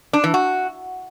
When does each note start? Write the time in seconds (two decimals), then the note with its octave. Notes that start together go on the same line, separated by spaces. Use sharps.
0.13 D4
0.24 E3
0.34 F#4